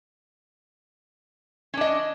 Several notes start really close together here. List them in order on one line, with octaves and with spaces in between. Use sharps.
C#4 D4 D#5